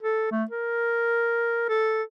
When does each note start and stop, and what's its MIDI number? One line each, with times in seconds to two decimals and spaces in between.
0.02 0.29 69
0.32 0.44 57
0.51 1.68 70
1.69 2.03 69